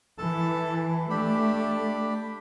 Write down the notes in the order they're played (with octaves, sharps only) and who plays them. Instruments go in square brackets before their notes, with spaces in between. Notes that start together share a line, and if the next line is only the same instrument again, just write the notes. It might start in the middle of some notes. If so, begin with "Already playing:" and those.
[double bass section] E3 [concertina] A4 A5
[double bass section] A3 [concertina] D4 G4 B5